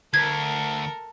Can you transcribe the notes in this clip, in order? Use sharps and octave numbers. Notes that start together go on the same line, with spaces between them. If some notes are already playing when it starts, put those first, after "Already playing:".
D2 A4 A#4 G#6